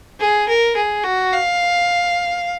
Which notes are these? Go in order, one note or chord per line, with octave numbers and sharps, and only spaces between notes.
G#4
A#4
G#4
F#4
F5